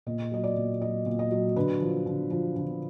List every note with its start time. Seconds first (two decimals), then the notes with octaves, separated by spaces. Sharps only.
0.06 A#2 D#5
0.32 F#3 D#5
0.44 D5
0.57 A#2
0.82 F#3 D#5
1.06 A#2
1.19 D#5
1.31 F#3
1.56 D3 B4
1.81 F3
2.06 D3
2.31 F3
2.56 D3